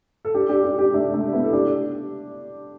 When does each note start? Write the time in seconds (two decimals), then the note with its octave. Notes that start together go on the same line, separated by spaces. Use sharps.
0.25 A4
0.35 D4 G4
0.49 D4 G4
0.64 D4 G4
0.79 D4 G4
0.94 A3 D4
1.13 A3 D4
1.33 B3 E4
1.44 A4
1.53 D4 G4